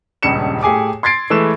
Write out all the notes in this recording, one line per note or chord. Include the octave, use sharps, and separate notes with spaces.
D#1 C#2 G2 C#7 E7
A2 G4 G#4 G#5 D6
C6 G#6 A6 C7 D7
E3 G#3 A3 B4 E6 E7